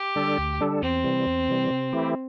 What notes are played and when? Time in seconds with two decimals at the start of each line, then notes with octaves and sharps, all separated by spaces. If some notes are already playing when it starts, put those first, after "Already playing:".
Already playing: G4
0.16 D3 G3 D4 A4
0.38 D2
0.60 D3 G3 D4 A4
0.82 E2 C4
1.04 C3 E3 G3
1.26 E2
1.49 C3 E3 G3
1.71 C3
1.93 E3 A3 E4 G4